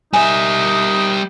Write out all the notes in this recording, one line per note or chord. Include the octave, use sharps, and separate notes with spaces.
G3 D#4 E5 G#5